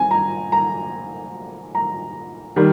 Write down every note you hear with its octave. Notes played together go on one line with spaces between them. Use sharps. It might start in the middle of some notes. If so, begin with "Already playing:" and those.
Already playing: C4 G#5
A#5
A#5
A#5
D#3 G3